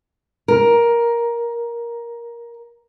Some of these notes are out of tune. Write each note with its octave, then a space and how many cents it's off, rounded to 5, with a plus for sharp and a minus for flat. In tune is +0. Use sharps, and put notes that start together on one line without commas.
A#4 +10